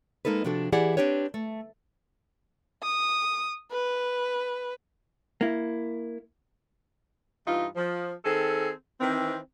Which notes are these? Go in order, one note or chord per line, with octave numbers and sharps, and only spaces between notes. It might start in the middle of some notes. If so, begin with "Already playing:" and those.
G#3 A#3 D#4 A4 B4
C3 F3 D4 F#4 A4
E3 E4 G4 G#4 D5 F#5
C4 D4 G4 B4 C#5
A3
D#6
B4
A#3 E4
G2 E3 D#4 F4
F3
D#3 C4 G#4 A4
D#3 E3 C4